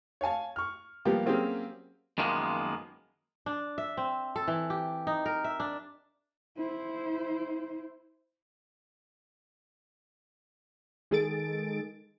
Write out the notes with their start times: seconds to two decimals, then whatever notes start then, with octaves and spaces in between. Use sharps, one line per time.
0.21 C#5 F5 G#5 A5
0.56 C#6 F6
1.05 F3 G3 A#3 B3 G4
1.25 F#3 A#3 C4 C#4 G4 G#4
2.18 F#2 D#3 F3 G#3 A#3 B3
3.46 D4
3.78 E5
3.97 C4
4.36 A4
4.48 E3
4.70 G4
5.07 D#4
5.26 A#4
5.44 E5
5.60 D4
6.57 E4 C5
11.11 D#3 G#3 G#4 A4 A6 D7